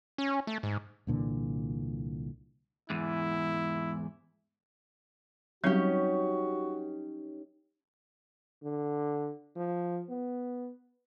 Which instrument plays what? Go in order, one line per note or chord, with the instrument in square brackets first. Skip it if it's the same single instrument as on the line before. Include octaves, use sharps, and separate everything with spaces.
[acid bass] C#4
A3
G#2
[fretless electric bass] C2 A#2 D3 E3
[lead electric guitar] E2 G#2 [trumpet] E4
[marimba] F#3 G3 C4 [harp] C#4 D#4 G4 [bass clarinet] F#4
[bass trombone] D3
F3
B3